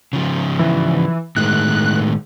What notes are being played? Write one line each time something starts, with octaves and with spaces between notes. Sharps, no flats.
C#3 F3
E3
A2 D#3 G#3 F#6